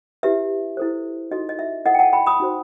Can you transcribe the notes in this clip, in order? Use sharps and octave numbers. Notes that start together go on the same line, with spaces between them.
E4 G4 B4 E5
E4 A4 C5
D#4 F#4 A4 D#5
D#5
E5
E4 A4 C5 D#5 F#5
G5
F#5 A5
G5 B5
B5 D#6
D#4 F#4 C5